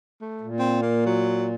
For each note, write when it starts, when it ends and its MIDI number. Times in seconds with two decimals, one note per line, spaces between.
0.21 0.49 57
0.41 1.55 46
0.59 0.81 60
0.82 1.03 58
1.06 1.51 54